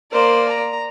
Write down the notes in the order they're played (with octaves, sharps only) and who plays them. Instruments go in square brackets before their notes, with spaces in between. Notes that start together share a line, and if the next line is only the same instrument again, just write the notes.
[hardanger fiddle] A#3 D5 [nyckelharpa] A#4 C5
[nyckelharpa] A#5